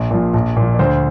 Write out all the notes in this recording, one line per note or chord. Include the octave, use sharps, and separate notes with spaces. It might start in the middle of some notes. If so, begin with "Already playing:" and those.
Already playing: A#1
A#2 F3
A#1
A#2 F3
D5
D2 C5